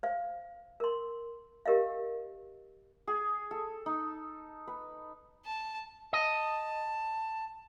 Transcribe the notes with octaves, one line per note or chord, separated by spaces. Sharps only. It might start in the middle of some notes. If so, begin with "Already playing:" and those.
C5 F5
A#4 C6
G4 A#4 D#5 F5
G#4
A4
D#4
B4
A5
D#5 A5